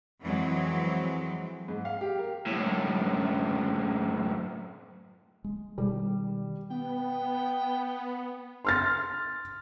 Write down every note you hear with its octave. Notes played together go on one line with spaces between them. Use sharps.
F2 E3 F#3 G#3 C4
G#2
F5
G4
A#4
F#2 A2
G#3
B2 D#3 G3
B3 G5
C6 F6 A6